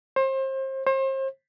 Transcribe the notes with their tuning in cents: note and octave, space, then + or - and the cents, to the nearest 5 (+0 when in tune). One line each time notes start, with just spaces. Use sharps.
C5 +30
C5 +35